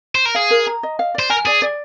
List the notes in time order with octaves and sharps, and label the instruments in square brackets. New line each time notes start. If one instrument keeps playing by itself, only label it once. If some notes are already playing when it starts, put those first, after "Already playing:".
[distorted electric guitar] C5
A#4
[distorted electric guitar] G#4 [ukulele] F5
[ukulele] A#4
A#5
D#5
F5
[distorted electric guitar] C5 [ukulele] D5
[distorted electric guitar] A#4 [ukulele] G#5
[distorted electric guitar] G#4 [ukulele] D5
[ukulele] D5